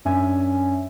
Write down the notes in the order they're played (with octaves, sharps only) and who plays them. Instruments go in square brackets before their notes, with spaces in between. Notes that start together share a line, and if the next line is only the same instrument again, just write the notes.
[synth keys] F#2 C#4 D4 E5 G#5